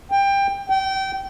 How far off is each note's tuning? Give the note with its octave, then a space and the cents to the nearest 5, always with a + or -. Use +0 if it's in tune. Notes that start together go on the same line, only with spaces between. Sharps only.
G5 +20
G5 -25